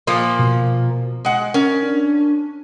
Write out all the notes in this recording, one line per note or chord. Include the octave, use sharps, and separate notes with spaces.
A#2 F3 A#3
B2
G#3 F#5
C#4 A#4
D4